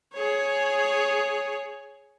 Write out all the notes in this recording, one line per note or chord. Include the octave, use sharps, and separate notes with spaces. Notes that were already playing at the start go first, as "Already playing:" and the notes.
G#4 C#5